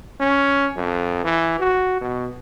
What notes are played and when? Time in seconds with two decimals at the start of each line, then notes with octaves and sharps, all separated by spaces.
0.20 C#4
0.76 F2
1.24 E3
1.60 F#4
2.01 B2